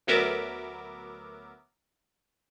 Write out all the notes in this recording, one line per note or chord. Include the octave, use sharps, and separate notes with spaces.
D2 F#3 B3 A#4 E5 D6